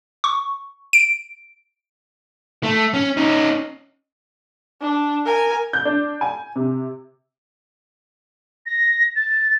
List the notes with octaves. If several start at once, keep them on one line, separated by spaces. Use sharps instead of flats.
C#6
D7
A3
C#4
C#4 D#4
D4
A#4 G#5
G6
D4
G#5
C3
A#6
A6